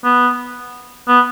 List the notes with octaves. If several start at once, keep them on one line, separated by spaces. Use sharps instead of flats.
B3
B3